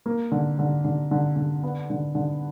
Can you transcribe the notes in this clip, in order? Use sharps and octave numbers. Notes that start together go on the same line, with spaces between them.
A#3
D3
D3
D3
D3
D3
B3
D3
D3